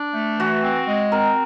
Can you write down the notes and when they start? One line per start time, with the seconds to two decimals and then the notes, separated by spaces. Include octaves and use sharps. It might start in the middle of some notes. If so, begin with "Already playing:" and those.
Already playing: D4
0.14 A3
0.39 E3 F#4
0.63 C4
0.88 G#3
1.12 C4 A#4